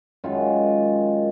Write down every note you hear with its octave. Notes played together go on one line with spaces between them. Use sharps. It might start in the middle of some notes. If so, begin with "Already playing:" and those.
F#2 D#3 G#3 F4